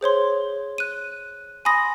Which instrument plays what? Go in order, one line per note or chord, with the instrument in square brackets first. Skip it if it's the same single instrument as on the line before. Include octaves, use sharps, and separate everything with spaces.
[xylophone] G#4 C5 C#5 C6
F#6 D#7
G#5 B5 C6 D#6 A#6